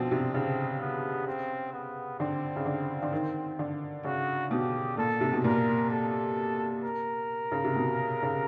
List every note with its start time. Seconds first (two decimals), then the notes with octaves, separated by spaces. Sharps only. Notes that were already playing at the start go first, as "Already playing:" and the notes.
Already playing: B2 D3 F3 C4
0.11 C3
0.34 C#3 C4
0.81 B3
1.27 C4
1.73 B3
2.20 D3 C4
2.56 C#3
2.66 D3
3.03 D3
3.12 D#3
3.59 D3
4.04 C#3 F#4
4.51 B2 G4
4.97 A#2 A4
5.21 C3
5.33 B2
5.44 A#2 A#4
5.90 A4
6.83 A#4
7.52 C#3
7.64 C3
7.76 B2
8.23 C#3